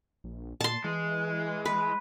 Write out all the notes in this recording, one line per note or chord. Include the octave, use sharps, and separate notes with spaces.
A#1
A#2 A5 C6
E3 G#3
B4